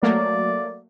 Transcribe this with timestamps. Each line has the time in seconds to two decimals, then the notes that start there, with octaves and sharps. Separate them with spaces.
0.02 F#3 A3 A#3 D5